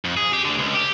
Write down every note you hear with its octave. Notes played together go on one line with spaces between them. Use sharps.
F2
G#4
G4
D2 D3
C#2
G4